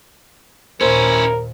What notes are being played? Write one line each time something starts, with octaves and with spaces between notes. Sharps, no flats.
D#2 A#2 C#4 E4 A#4 C5